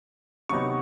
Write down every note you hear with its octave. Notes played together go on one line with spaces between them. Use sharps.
C3 D#3 F#3 B3 D#4 C#6